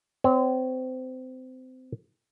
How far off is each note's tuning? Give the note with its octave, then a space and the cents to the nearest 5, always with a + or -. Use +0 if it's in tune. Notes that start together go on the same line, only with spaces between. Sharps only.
C4 -25 C#5 +5